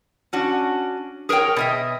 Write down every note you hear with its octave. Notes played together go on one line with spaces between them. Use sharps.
C#4 D4 F#4
G#4 A#4 C5 C#5 G5
B2 D#5 E5